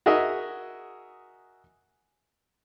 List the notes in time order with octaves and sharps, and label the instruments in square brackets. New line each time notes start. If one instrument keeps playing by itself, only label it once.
[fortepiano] F#4 G#4 A#4 D#5 E5